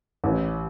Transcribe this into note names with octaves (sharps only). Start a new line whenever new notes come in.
A1